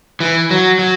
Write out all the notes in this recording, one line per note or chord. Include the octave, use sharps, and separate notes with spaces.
E3
F#3
F#3